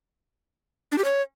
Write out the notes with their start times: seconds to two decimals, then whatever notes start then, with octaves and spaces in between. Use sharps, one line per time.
0.92 D4
0.98 G4
1.04 C#5